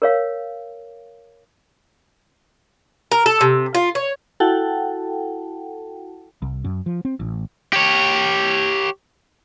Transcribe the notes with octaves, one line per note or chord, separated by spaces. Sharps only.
A#4 C#5 F5
A#4
A4
C3
F4
C#5
E4 F#4 A4 F#5 G5 A5
C2
F#2
F3
C4
A1
G4 C#5